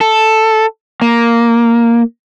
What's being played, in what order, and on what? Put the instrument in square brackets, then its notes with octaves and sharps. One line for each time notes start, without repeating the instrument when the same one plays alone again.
[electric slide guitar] A4
A#3